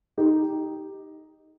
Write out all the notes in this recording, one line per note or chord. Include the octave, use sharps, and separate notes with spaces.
D#4 G4